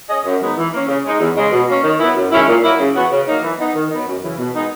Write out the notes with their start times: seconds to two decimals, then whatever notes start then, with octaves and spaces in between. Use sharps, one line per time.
0.08 C#4 G#4 D#5
0.25 F#2
0.40 D#3 G#3 B3 D#4
0.56 E3
0.72 A#3 C#4
0.88 C#3
1.04 G#3 D#4
1.19 E2
1.35 C#3 G#3
1.52 B2
1.67 A#3 C#4
1.83 D#3
1.99 F#3 B3 E4
2.15 F#2
2.31 D#3 G#3 C#4 E4
2.47 A#2
2.63 F#3 A#3 E4
2.79 C#3
2.95 E3 B3 F#4
3.11 C#3
3.26 F#3 A#3 D#4
3.42 E3
3.58 B3 D#4
3.75 D#3
3.90 F#3 B3 D#4
4.06 F#2
4.22 C#3 E3
4.38 B2
4.54 G#3 B3 D#4